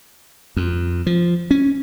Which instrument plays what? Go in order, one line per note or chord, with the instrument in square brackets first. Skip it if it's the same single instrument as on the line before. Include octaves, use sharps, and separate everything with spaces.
[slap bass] F2
F3
C#4